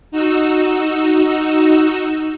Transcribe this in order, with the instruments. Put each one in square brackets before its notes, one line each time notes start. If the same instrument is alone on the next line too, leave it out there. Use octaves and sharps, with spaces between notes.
[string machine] D#4 F#4 E6